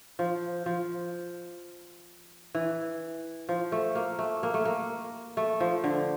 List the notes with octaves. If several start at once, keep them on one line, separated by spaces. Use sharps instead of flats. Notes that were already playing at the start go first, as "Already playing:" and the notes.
F3
F3
E3
F3
A3
A#3
A3
A#3
A3
A#3
A3
F3
D3